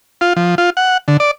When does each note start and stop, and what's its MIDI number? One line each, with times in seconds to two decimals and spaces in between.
0.21 0.33 65
0.36 0.55 53
0.58 0.70 65
0.77 0.97 78
1.08 1.17 50
1.20 1.31 74